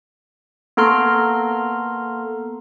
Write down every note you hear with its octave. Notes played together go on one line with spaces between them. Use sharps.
A#3 B3 A4 A#5 C6 F6